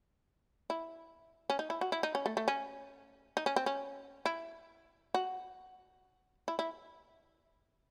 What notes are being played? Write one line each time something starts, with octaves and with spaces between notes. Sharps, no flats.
E4
C#4
D#4
E4
F#4
E4
D#4
C#4
A3
A3
C#4
D#4
C#4
C4
C#4
E4
F#4
E4
E4